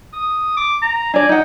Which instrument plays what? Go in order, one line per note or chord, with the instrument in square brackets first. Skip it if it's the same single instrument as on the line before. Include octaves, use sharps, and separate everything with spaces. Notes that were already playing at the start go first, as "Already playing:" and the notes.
[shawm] D#6
D6
A#5
[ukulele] D4 D5 [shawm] G#5
[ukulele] D#4 F#5 [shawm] G5